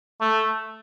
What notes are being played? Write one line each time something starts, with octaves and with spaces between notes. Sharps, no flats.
A3